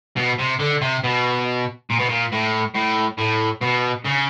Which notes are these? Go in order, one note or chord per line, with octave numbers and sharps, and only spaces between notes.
B2
C3
D3
C3
B2
A#2
B2
A#2
A2
A2
A2
B2
C#3